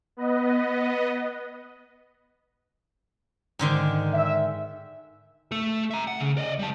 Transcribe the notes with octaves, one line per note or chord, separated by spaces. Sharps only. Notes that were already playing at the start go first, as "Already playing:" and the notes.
B3 B4 D#5
G#2 D3 D#3
E5
A3 A4
E5 A#5
F#5
C#3
D5 D#5
G3 A5